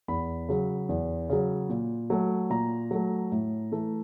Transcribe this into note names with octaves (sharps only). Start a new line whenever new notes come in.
E2 B5
C#3 F#3
E2
C#3 F#3
A#2
F#3 A3
A#2 A#5
F#3 A3
A2
E3 A3